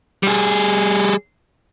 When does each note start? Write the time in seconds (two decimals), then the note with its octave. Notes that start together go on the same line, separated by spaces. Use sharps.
0.23 G3 G#4